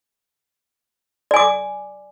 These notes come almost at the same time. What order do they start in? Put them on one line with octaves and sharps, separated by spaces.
D5 G#5 D6